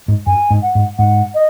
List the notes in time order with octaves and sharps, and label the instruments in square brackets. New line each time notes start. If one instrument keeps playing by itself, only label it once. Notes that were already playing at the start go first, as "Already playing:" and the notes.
[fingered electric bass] G#2
[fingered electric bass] F#2 [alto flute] G#5
[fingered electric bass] G#2
[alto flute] F#5
[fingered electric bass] G#2
[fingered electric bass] G#2 [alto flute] F#5
[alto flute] D#5